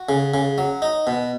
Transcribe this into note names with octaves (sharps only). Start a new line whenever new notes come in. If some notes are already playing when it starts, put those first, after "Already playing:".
Already playing: F#4
C#3
C#3
F#3
D#4
B2